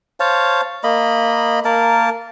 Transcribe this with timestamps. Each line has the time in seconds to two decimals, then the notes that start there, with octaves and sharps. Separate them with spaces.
0.20 C5 C#5 F5 A5
0.84 A#3 D#5 B5
1.65 A#3 A#4 A5